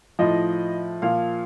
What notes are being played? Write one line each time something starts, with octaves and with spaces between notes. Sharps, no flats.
A2 F3 D#5
A#2 F3 F5